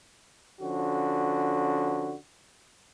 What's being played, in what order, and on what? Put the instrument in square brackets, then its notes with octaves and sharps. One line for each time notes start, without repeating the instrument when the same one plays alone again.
[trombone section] D3 F3 C#4 F#4